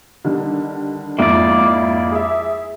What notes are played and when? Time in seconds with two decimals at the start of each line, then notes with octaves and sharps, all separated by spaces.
0.25 D3 D#3 G3
1.19 F2 G#2 A#3 E4 D5
2.11 G#4 E5